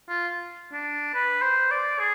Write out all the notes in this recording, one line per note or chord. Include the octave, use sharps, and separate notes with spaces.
F4
D4
B4
C5
D5
G#4